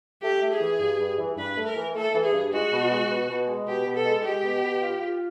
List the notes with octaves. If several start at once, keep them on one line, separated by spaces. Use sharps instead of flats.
A3 G4
A3
G#4
E3
G2
G2
E3
G2 B4
A3
A#4
E3
A3 A4
E3
G#4
G2
G#3 F#4
B2
G#3
B2
B2
G#3
B2 G4
B2
A4
G#3
G#3 G4
B2
B2
F4
F4